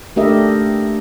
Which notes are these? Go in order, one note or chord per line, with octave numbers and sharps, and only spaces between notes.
A3 D4 G4 A#4 D#5 E5